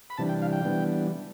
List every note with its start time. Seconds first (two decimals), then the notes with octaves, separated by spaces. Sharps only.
0.10 B5
0.18 C3 E3 G3 D4 A5
0.29 G5
0.42 F5
0.53 G5
0.64 E3 G3 B3 D4